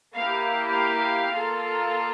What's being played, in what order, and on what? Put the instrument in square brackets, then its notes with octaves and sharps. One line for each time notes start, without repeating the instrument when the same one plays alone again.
[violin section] A#3 E4 G4 F5
F5
A#3 F4 A4